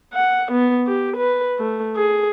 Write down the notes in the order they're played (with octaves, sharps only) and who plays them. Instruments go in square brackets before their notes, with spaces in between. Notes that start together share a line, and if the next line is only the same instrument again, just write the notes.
[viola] F#5
B3
G4
B4
A3
G#4